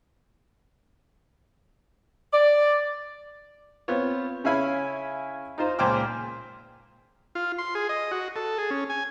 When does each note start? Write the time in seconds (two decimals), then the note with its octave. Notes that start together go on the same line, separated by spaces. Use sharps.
2.32 D5
3.88 B3 C4 F4 C#5
4.44 C#3 C#4 E4 F5 G#5 B5
5.58 D#4 F4 C5
5.79 C#2 A#2 C5 G5 D6 F6
7.35 F4
7.58 C6
7.75 G#4
7.89 D#5
8.11 F#4
8.36 A4
8.58 G#4
8.70 C#4
8.90 G#5